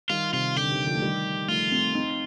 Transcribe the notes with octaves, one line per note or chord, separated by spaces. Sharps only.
D#3 G3 F4
C3 D#3 F4
D3 G4
C3 D#3
D3 F3
A3
D#3 G3
F3 A3 F4
A3 C4
C4 D#4